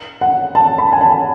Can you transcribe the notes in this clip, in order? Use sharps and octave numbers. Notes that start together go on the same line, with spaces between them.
F#5
A5
B5
G#5
A5